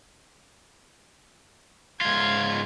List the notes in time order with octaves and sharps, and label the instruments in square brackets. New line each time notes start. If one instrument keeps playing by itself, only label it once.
[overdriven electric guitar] G#2 F4 [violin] G#6